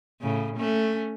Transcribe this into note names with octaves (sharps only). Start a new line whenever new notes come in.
A2 C#3
A3 C#4